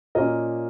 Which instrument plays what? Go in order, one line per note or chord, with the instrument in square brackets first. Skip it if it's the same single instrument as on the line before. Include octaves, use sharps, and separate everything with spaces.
[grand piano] A#2 A#3 C#4 A#4 D#5